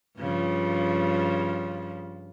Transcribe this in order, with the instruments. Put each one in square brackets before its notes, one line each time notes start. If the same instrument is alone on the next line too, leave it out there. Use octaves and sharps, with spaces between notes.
[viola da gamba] G2 C#3 F3